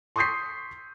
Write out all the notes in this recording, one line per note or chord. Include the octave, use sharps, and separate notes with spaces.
C6 C#6 D#6 G6 B6 C7